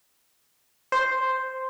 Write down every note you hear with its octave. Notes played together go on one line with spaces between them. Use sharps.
C5